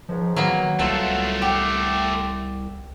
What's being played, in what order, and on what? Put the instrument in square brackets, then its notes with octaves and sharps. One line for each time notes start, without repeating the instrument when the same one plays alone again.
[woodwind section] C#2 G#2 [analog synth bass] F3
[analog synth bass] D#3 [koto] F#3 A#3 B3
[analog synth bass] C2 [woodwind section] E3 F4 F#5 [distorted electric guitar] A3 C4 [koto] A4
[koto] G4 [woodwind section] F#5 G5 D6